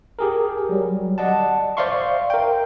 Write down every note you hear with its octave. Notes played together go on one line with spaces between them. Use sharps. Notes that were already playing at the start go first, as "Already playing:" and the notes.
G4 G#4 A#4
F#3 G3
D5 D#5 F#5 A5
C5 D5 E5 F5 C6 C#6
A#4 G5